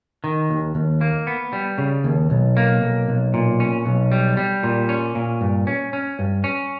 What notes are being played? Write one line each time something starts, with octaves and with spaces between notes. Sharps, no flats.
D#3
D#2
D#2
A#3
B3
G3
C#3
D#2
B1
A#3
B1
B1
A#2
C#4
B1
G3
G3
A#2
C#4
A#2
G2
C#4
C#4
G2
C#4